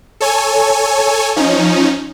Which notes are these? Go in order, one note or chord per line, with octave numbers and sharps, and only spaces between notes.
A4 C#5 G#5
F3 C#4 D#4